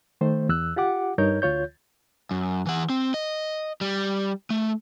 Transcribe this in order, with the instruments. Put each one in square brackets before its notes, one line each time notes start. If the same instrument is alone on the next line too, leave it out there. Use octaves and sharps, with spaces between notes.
[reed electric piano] D#3 A3 C5
E2 E6 F#6
F4 G4 F#5 D6
G2 D#4 A#4 C#5 G6
D2 F4 C#5 G6
[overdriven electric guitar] F#2
E3 F#5
C4
D#5
G3
A3